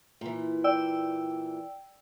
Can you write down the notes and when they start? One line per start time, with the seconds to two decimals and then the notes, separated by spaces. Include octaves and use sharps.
0.21 A#2 E3
0.64 D5 G5 E6